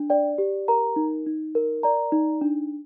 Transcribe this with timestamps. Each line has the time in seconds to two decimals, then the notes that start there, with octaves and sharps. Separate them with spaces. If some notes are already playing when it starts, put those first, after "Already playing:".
Already playing: D4
0.10 D5 G5
0.38 G4
0.68 A#4 A#5
0.96 D#4
1.26 D#4
1.55 A#4
1.83 D5 A#5
2.12 D#4
2.41 D4